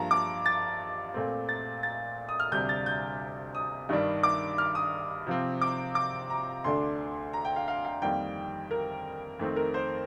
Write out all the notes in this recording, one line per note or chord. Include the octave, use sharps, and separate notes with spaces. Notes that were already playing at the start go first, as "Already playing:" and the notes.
Already playing: G2 F3 A#3 A5 A#5
D6
A6
A#2 A3 C4
A6
A6
D#6
F6
D2 C3 G3 D4 G6
A6
G6
D#6
G2 D#3 G3 D4
D6
F6
D#6
C3 F3 C4
D6
D6
A#5
D2 D3 A3 D4 C6
A#5
G5
F5
F5
F5
F2 D#3 G3 A#3 G5
A#4
F2 D#3 A3 C4
A#4
C5